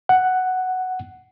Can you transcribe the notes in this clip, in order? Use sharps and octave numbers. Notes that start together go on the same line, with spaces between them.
F#5